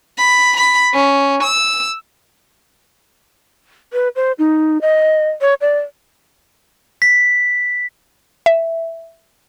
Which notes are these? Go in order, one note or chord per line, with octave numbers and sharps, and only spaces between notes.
B5
B5
C#4
E6
B4
C5
D#4
D#5
C#5
D5
B6
E5